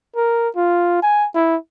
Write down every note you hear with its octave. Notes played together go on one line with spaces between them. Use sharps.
A#4
F4
G#5
E4